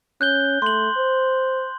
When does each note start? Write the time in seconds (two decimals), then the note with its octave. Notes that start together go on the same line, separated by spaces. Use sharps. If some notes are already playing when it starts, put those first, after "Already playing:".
0.21 C#4 F#6 G6 G7
0.62 A3 C6 F#7
0.97 C5